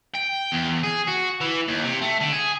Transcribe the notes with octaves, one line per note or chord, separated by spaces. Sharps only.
G5
E2
G#4
F#4
E3
D#2
C3
A3
D3
G#4